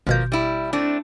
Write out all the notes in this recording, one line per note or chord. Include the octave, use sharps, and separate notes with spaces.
G#1 B2 F3 A#3 G6
G3 E4
A3 C4 D4